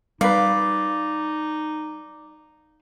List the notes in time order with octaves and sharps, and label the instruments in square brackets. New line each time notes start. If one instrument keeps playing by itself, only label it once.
[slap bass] G3 [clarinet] D#4 [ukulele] B4 F5 [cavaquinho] D5